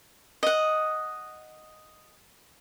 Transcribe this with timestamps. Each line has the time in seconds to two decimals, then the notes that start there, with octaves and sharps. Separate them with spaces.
0.43 D#5 F#5